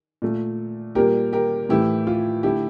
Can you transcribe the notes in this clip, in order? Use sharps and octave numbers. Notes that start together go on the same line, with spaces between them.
A#2 A3
A#2 G3 A#3 G4 A#4
G4 A#4
A2 E3 A3 E4 G4
F4
D3 A3 E4 G4